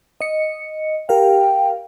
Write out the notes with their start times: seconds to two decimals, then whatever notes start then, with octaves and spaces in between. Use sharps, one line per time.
0.21 D#5 C#7
1.09 G4 A#4 F5 G5